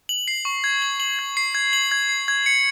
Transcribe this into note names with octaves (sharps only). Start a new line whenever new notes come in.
F#7
C7
C#6
G#6
F#7
F#7
G#6
C7
G#6
F#7
G#6
C7
G#6
C#7